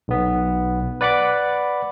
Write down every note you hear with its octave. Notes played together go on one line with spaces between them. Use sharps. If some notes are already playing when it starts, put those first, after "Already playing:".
B1 B3
B4 D5 F#5 B5 D6